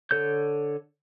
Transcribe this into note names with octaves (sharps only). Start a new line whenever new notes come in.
D3 A4 C#5 G6